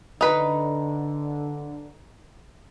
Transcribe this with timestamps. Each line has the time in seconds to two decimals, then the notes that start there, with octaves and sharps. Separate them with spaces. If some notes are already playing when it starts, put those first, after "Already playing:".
0.21 D3 D#4 B4